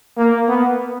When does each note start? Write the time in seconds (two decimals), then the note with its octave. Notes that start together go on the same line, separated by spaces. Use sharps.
0.18 A#3
0.49 B3